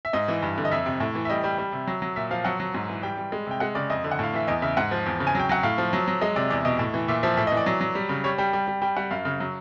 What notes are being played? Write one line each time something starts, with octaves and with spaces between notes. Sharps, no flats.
E5
G#2 D#5
E3
G2
D3
D#5
F2 E5
C3
A2
E3
E5
G3 D#5
G3
G3
C3
F#3
F#3
A#2 E5
F3 F5
F#3 F#5
F#3
G#2
E3
G3 G5
G3
G#3
C3 G5
G#3 F#5
C#3 D5
F2 D#5
D3
F#5
A2 F5
E3 E5
E2 D#5
C#3 E5
G#2 F#5
F3
E2
C#3
G#5
F#3 G5
F#3 F#5
A2 F5
F3
F#3
F#3
G#3 D#5
C3 D5
E2 D5
B2 D#5
A2
E3
A#2 E5
F3 E5
A2 E5
D#5
E3
D5
F#3
F#3
G3
C#3
G3 C#5
G3 G5
G3
G3
G3 G5
G3 F#5
F#2 F5
C#3
F#3